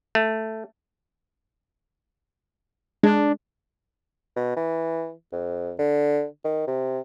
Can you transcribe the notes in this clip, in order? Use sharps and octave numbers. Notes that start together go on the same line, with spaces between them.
A3
G#3 D4
B2
E3
F2
D3
D#3
C3